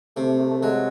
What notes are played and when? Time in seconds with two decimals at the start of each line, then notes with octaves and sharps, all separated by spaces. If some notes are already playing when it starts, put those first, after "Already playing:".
0.16 C3 A3
0.39 A3
0.51 A3
0.62 F#3 G#3